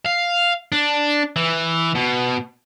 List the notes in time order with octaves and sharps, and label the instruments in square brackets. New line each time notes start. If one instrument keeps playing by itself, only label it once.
[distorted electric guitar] F5
D4
E3
B2